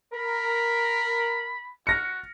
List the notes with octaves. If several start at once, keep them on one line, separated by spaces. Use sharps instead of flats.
A#4 B5
F#4 F6 A#6 C#7